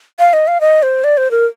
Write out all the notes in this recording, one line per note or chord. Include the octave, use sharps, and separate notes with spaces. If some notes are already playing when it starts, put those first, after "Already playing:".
F5
D#5
F5
D#5
C5
D5
C5
A#4